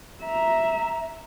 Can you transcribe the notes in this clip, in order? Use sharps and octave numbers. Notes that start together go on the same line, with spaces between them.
E5 A#5